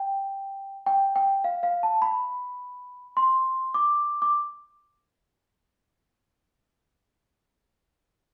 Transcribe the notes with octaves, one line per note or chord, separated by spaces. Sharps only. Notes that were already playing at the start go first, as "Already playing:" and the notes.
Already playing: G5
G5
G5
F5
F5
A5
B5
C6
D6
D6